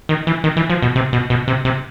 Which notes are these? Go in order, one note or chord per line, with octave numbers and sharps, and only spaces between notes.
D#3
E3
D#3
E3
F3
B2
C3
B2
B2
C3
C3